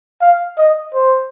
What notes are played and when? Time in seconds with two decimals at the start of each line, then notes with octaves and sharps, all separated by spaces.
0.21 F5
0.58 D#5
0.94 C5